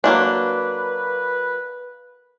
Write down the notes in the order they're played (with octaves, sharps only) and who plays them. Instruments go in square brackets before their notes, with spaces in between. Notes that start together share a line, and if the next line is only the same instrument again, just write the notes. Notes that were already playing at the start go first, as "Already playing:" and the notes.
[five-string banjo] F#3 A#3 D4 [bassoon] B4